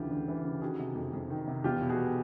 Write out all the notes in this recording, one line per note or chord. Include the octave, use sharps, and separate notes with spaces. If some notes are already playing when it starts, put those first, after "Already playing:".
Already playing: D2 C#3 E3 F4 G4
D2
E3
C#3
D#3 F#4 G#4
C3
F2
F2
D#3
C3
E2 F4 G4
B2
F#4 G#4